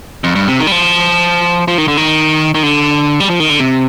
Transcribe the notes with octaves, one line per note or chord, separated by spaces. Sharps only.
F2
G2
C3
D#3
G3
F3
F3
D#3
D3
D#3
D#3
D3
G3
F3
D#3
D3
C3